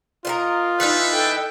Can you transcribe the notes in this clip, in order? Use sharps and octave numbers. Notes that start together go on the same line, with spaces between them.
F4 A#4 B4 D#5
E3 D4 D#4 B4 E5
A4 G5